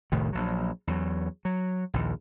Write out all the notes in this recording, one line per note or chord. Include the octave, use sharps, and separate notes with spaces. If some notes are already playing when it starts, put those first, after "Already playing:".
F1 C2 A2 D#3
A#1 F#3
E2 F#3
F#3
A#1 D#2